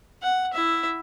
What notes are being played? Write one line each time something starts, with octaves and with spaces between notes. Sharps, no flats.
F#5
E4 E5